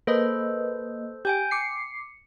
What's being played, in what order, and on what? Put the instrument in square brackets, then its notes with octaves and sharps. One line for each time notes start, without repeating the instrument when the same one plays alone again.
[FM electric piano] A#3 B4 D#5 [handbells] A4 C5
[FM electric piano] G4 [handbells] G5 G#5 G6
[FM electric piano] D6 C7 [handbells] C#7